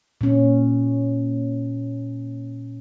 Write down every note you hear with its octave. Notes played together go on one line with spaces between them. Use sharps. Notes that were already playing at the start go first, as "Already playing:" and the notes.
A#2 C#4